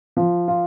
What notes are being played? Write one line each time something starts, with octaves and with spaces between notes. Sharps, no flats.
F3
F4